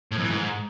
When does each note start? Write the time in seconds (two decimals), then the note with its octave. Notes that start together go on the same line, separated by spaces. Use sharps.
0.11 A2
0.18 F2
0.24 E3
0.30 G#2